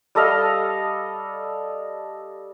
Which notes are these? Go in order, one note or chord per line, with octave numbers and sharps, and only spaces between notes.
G3 A4 D#5 F5